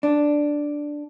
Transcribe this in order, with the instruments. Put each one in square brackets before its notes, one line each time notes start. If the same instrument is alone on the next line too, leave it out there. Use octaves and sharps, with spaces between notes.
[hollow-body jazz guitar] D4